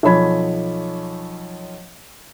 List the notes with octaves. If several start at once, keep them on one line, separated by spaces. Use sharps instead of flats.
B1 F3 C#5 B5 G#6